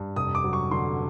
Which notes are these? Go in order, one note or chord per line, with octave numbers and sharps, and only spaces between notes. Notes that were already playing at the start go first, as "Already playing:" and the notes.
Already playing: G2
F1 D#6
D6
F#3
C#6
D3 C6